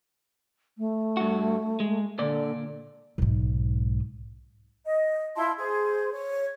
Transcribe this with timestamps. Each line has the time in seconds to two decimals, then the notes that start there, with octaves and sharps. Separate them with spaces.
0.78 A3
1.17 G2 F#4
1.80 G#3
2.19 A#2 D3 D5
3.18 B1 G#2
4.85 D#5
5.36 E4 F4 A5 C6
5.58 G#4 C5
6.12 C#5